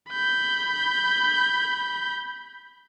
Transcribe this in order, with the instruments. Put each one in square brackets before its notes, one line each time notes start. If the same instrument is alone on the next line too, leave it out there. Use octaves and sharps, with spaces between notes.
[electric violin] B5 G6